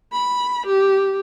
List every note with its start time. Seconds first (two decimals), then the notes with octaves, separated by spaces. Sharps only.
0.12 B5
0.66 G4